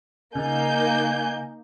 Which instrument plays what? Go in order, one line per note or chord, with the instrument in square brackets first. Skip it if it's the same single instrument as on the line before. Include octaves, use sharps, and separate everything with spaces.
[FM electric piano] C#3 [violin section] A#3 D#4 G6 [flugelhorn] G#5